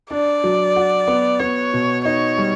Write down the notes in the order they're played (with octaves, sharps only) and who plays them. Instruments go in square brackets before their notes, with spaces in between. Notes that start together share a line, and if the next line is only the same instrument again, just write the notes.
[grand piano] D4 [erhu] D5
[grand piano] F#3
F#4
B3
[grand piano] B3 [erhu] C#5
[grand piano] B2
[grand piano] D#4 [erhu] C#5
[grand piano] G3